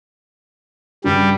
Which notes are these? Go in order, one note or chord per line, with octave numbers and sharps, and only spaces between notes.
G2 C#3 F#3 G3